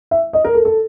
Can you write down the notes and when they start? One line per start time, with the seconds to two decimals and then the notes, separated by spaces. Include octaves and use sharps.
0.11 E5
0.33 D#5
0.44 A#4
0.55 A4
0.65 A4